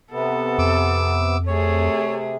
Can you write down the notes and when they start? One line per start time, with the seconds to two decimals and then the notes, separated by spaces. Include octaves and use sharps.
0.11 C3 B3 A4
0.58 F2 D6 E6
1.47 C3 A3 G#4 C#5